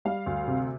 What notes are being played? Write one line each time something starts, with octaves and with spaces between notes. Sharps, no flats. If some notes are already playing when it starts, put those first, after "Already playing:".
G3 F5
D2
C3